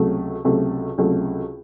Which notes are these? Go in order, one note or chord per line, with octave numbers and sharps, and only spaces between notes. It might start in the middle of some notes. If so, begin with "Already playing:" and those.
Already playing: C#2 C3 F#3 A3
C#2 C3 F#3 A3
C#2 C3 F#3 A3